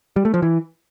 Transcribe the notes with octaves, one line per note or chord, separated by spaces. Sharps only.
G3
A3
F3
E3